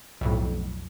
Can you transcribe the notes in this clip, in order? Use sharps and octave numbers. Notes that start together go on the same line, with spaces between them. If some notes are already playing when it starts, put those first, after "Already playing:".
B1 F2 A2